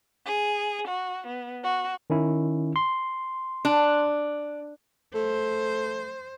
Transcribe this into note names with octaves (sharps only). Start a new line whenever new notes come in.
G#4
F#4
B3
F#4
D#3 C#4 E4
C6
D4
A3 C5